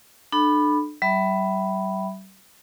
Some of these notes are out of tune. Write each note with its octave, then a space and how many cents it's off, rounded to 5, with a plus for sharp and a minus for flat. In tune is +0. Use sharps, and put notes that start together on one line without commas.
D4 +30 A4 -20 B5 +0
G3 -40 E5 +0 B5 +0